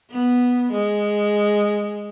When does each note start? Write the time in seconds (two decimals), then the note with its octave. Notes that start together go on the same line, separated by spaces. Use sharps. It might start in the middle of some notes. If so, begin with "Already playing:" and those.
0.11 B3
0.72 G#3